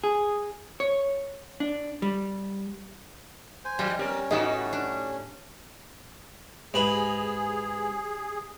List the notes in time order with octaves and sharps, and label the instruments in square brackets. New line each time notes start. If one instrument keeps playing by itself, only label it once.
[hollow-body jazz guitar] G#4
C#5
D4
G3
[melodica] C5 G#5
[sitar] F3 [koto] G3
[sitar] B3 G4 A#4 [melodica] C#4
[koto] A2 B3 G5 [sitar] G3 D#4 F#4 [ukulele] D#5
[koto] D4
[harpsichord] G#2 B4 [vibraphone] G4 G#5 [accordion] G#4